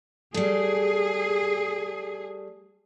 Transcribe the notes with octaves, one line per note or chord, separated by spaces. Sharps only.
G3 A3 G#4